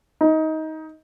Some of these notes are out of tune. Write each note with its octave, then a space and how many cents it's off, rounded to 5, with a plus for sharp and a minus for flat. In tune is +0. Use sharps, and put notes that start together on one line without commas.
D#4 +20